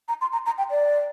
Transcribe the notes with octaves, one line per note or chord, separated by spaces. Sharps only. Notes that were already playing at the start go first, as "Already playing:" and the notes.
A#5
C6
A#5
A#5
G5
D5